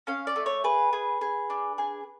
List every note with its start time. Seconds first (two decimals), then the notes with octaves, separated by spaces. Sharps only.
0.07 C#4 F5
0.27 D5
0.36 A3
0.46 C#5
0.64 G#4 B4
0.93 G#4
1.21 G#4
1.50 D4
1.78 G#4